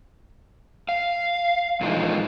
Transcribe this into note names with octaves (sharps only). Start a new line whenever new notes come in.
F5
A#2 E3 F3 G#3 D#4